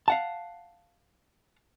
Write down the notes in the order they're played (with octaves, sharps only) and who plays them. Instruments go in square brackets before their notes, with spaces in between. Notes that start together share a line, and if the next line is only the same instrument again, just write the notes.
[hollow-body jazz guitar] F5 F#5 A5